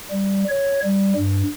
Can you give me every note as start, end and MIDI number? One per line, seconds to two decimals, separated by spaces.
0.10 0.44 55
0.49 0.80 73
0.83 1.13 55
1.16 1.43 43